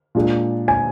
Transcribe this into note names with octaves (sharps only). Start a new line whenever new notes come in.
A#2 G#3 D4 G#4
G#5